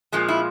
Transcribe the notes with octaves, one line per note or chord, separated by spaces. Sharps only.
A#2 F3 G#3
E4